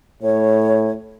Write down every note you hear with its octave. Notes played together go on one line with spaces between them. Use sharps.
A2 C#5